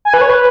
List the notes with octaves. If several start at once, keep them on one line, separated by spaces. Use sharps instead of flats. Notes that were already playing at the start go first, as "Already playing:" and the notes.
G#5
B4
C#5
B4